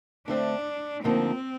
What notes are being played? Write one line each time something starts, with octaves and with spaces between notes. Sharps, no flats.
D3 A3 C4 D4
D2 D3 F3 A#3 C4 D#4